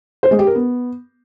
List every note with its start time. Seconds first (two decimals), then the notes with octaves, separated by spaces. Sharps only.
0.23 C5
0.31 G#3
0.39 G4
0.47 A#4
0.55 B3